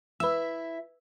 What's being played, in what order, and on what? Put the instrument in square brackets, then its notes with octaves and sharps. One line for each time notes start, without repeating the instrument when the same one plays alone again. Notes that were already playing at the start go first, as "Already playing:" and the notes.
[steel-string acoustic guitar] E4 E5 [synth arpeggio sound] B4 E6